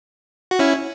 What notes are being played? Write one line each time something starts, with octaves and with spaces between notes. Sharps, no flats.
F#4
C#4 E4